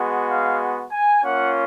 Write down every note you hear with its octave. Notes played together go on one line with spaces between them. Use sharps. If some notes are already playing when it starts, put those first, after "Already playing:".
Already playing: G#3 B3 F#4
F5
G#5
A#3 C#4 F4 F#5